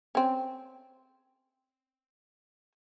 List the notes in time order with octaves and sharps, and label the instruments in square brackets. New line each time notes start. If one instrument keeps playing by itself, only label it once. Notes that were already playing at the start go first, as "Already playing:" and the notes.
[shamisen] C4 C#4